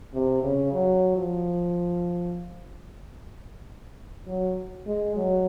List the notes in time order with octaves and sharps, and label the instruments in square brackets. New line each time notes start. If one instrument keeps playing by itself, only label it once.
[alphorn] C3
C#3
F#3
F3
F#3
G#3
F#3